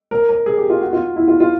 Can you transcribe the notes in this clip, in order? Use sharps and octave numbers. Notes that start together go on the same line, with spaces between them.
A#4
A#4
G#4
G4
F4
F#4
F4
E4
F4
F4